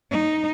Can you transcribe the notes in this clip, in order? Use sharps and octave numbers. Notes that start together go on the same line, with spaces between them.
D#4